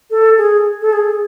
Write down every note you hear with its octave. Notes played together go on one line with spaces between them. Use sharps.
A4
G#4
A4
G#4